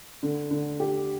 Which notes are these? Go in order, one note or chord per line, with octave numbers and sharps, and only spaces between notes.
D3
D3
G4